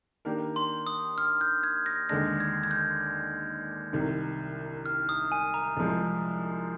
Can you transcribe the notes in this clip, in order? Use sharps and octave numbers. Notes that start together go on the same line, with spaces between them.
D#3 A#3 D4 G4 A#4
C6
D#6
F6
G6
G#6
A#6
D#2 D3 G#3 D4 A#6
G#6
G#6
G6
C2 C3 D#3
F6
D#6
G#5
A#5
C2 C3 F3 G#3